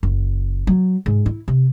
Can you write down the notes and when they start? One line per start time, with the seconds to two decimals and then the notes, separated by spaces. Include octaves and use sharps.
0.03 F#1
0.67 F#3
1.06 G#2
1.26 E4
1.48 C3